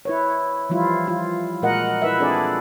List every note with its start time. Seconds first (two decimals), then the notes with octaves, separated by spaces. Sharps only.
0.05 E4 B4 C#5
0.69 E3 F3 G3 E4 F4
1.08 F4
1.62 A#2 G#3 F#4 A#4 D#5 F#5
2.02 E4 B4 E5
2.20 C4 D4 G#4 A4 D5